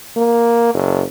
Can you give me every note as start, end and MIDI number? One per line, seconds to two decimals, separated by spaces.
0.17 0.69 58
0.74 1.04 30